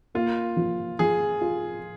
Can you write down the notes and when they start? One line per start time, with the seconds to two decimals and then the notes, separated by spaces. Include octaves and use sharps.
0.15 A#3 F4
0.56 F3
0.99 F3 G#4
1.41 F4